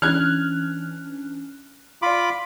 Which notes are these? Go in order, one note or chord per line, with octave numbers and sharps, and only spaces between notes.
E3 C#4 D4 F6 F#6 G#6
F4 D5 B5 C6 D6